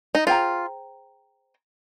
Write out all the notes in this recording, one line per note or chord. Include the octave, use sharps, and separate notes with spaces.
D#4
F4 G#4 C5 G5 A#5